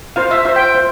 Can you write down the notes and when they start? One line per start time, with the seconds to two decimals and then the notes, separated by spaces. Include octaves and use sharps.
0.16 F4 C5 F5
0.31 E5
0.45 F4 C5 E5
0.56 G5
0.75 F4 C5